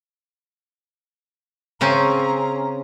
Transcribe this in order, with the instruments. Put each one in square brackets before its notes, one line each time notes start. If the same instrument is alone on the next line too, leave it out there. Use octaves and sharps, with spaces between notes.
[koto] C#3 C4 C#4 [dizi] A#5